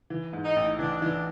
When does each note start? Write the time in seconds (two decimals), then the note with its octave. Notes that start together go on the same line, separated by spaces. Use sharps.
0.10 E3
0.33 G#2
0.44 D#4
0.56 A1
0.79 E3 D4
1.02 E3